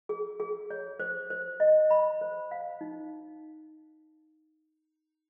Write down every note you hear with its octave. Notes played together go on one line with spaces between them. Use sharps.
G#4
G#4
C#5
C5
C5
D#5
B5
C5
F5
D#4